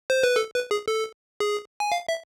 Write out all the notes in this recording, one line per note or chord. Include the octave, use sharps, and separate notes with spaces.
C5
B4
A4
B4
G#4
A4
G#4
G#5
F5
E5